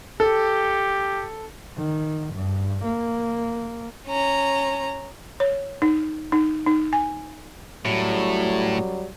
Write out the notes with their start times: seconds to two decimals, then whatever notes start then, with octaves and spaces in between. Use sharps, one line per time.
0.20 G4 A4
1.77 D#3
2.34 G2
2.85 A#3
4.07 C#4 A#5
5.40 C#5
5.82 D#4
6.32 D#4
6.66 D#4
6.93 G#5
7.85 F#2 A2 F#3 G3